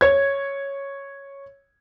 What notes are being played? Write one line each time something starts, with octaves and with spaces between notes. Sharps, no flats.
C#5 G#6